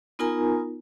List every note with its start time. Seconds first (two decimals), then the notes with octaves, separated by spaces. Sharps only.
0.19 B3 D#4 F4 A#4 G#5 A#5